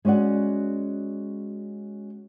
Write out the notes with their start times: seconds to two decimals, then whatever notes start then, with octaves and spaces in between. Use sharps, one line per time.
0.05 G#3 C#4 F#4 D5 F#5